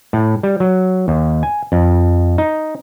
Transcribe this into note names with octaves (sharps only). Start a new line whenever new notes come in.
A2
G3
F#3
D#2
G#5
F2
D#4